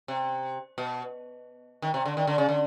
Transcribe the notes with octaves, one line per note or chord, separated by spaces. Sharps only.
C3
B2
D#3
C3
D3
D#3
D3
C#3
D3